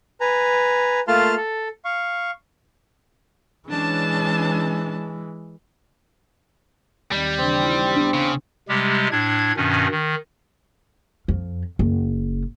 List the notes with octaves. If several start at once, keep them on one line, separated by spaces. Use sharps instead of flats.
B4 G#5 A#5
A3 A#3 F4 A5 C6 F6
A4
F5 C#6
E3 G#3 C#4 D4 A5
D#2 D#3 G3 C4
C#3 E3 C4 D4
D#4 E4
B3 D4 C5
C#3
C3 G3 G#3 G4
A2 D4 G#6
G2 B2 D#3 C#4
D#3
F2
F#1